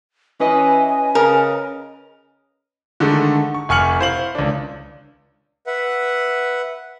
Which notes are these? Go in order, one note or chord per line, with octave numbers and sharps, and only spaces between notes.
E3 C#4 B4 D#5 G#5
C#3 A#4
D3 D#3 G#3 A3
C#6
F1 G#5 C#6 F6 C#7 F#7
E4 C5 F5 F#7
C#2 D4
B4 E5 F#5